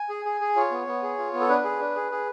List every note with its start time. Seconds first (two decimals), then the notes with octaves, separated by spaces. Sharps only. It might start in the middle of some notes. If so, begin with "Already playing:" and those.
Already playing: G#5
0.09 G#4
0.25 G#4
0.41 G#4
0.56 F4 C#5
0.71 B3
0.87 B3
1.03 G#4
1.18 F4
1.33 B3
1.40 A4
1.49 D4 B4
1.64 G#4
1.80 D4
1.96 G#4
2.11 G#4